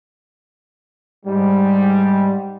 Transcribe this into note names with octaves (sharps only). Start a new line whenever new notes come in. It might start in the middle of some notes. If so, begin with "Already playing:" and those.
G#2 G3